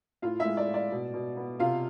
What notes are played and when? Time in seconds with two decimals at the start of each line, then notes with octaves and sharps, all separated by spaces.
0.22 A2 F4 F5
0.39 E4 E5
0.45 G#3
0.57 D5
0.68 A2
0.74 D5
0.92 B2
1.14 B2
1.37 B3
1.60 C3 F4 F5